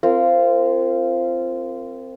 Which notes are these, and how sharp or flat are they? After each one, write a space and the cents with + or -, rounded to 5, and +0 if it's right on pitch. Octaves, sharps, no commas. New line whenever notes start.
C4 +0 F4 -20 A#4 -30